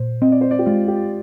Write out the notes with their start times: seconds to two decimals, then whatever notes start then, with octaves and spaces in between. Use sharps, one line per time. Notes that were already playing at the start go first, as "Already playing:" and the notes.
Already playing: A#2 C5
0.22 C4 D#5
0.32 D5
0.41 C5
0.51 D5
0.59 G4
0.66 G#3 F4
0.88 G4